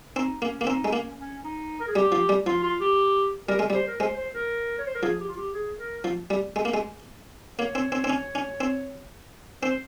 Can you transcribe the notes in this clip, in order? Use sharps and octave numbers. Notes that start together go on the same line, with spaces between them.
C4 D#4
A#3 C#4
A#3
C4 D#4
G#3
A#3 C#4
C#4
D#4
A#4
G#4
G3 G4
F3
G3
F3 F4
F4
G4
G3 A#4
G#3
G3
C5
A#4
G#3 C5
C5
A#4
C#5
C5
A#4
F3 G#4
G4
F4
G4
G#4
A#4
F3
G3
G#3
A#3
G#3
A#3 C#5
C4
C4
C4
C#4
C#4
C4
C4 C5